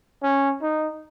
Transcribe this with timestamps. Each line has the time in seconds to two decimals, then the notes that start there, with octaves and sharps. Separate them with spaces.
0.23 C#4
0.62 D#4